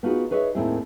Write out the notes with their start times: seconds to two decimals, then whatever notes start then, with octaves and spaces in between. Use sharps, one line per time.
0.03 B3 D#4 F4 F#4 G#4
0.31 G#4 B4 C#5 D#5 E5
0.55 D#2 A2 D#3 C4 E4 G#4